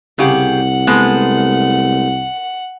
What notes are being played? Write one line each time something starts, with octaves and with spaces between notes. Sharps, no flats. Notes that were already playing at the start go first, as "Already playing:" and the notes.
C2 C#3 G4 G#4 F#5
G#3 A3 B3